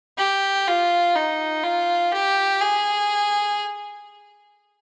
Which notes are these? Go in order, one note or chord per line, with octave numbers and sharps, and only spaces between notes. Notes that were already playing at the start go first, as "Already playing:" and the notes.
G4
F4
D#4
F4
G4
G#4